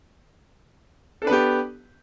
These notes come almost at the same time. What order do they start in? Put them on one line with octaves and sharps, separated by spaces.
A4 D4 B4 B3 G4